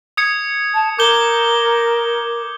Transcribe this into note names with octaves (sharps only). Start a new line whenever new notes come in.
D#6 G#6 C#7
A5
A#4 D6 G6 G7